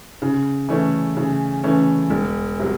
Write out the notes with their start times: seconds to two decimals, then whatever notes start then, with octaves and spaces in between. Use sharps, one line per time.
0.22 C#3
0.69 E3 A3 C#4
1.16 C#3
1.63 E3 A3 C#4
2.10 E1
2.59 C3 F#3